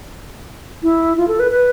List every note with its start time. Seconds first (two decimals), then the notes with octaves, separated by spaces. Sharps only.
0.83 E4
1.17 F4
1.28 A4
1.39 B4
1.51 B4